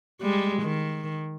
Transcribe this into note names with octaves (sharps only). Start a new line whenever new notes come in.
G3 G#3
D#3